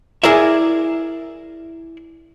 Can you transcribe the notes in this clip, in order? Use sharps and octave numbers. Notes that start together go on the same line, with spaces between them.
E4 G#4 A#4 D5 E5